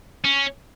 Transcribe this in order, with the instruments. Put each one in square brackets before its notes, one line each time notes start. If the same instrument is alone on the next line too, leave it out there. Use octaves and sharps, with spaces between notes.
[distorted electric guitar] C#4